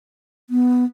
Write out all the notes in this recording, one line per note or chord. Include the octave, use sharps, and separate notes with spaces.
B3